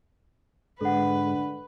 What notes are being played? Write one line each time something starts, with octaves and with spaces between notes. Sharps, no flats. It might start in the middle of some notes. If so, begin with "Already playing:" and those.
G#2 D3 G#3 A4 B4 F#5